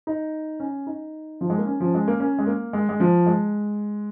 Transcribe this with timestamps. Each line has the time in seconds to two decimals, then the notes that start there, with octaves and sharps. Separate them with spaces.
0.07 D#4
0.60 C#4
0.87 D#4
1.41 F3
1.50 G#3
1.58 A#3
1.67 C#4
1.80 F3
1.95 G#3
2.08 A#3
2.20 C#4
2.39 G#3
2.47 A#3
2.73 G#3
2.89 G#3
3.00 F3
3.26 G#3